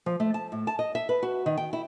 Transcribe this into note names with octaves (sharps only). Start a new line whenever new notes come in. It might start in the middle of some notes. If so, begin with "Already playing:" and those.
F3
A3
A5
A2
A5
D#5
E5
B4
F#4
D#3
G5
E4